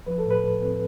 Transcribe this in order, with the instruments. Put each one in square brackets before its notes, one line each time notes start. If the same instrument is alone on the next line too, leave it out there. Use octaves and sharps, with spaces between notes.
[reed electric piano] F3 B4
A4
A2
B4
A2
C4